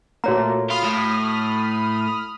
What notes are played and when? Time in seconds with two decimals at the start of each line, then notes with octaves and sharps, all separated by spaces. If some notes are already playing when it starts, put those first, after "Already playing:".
0.24 A#2 A3 A#3 F#4 C#5 A#5
0.70 F4 B5 D#6 F6
0.84 A2